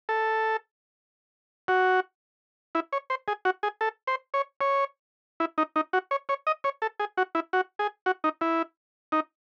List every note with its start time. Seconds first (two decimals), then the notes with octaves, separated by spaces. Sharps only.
0.09 A4
1.68 F#4
2.75 E4
2.93 C#5
3.10 C5
3.28 G#4
3.45 F#4
3.63 G#4
3.81 A4
4.07 C5
4.34 C#5
4.61 C#5
5.40 E4
5.58 D#4
5.76 D#4
5.93 F#4
6.11 C#5
6.29 C#5
6.47 D#5
6.64 C#5
6.82 A4
7.00 G#4
7.17 F#4
7.35 E4
7.53 F#4
7.79 G#4
8.06 F#4
8.24 D#4
8.41 E4
9.12 D#4